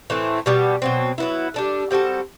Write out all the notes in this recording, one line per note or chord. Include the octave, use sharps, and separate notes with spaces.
A2 E3 A3 C4
B2 G3 B3
B2 F#3 C4
F#3 B3 E4
G3 D4 A4
G3 C4 F#4 A4